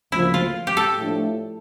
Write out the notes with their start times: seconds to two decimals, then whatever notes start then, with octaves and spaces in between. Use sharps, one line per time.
0.12 D2 C#3 F3 A#3 E4
0.34 F4
0.67 G4
0.77 A4
0.97 A2 F3 A3 D4